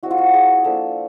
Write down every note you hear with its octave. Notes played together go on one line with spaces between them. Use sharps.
G#3 C4 E4 F#4
F4
F#4
G#4
F3 A#3 D4 A4